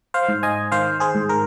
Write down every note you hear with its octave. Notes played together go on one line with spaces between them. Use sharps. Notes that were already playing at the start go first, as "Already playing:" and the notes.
C5 F5
G#2
D#5 G#5
D#3 C5 F5
G#4 C5
G#2
A#4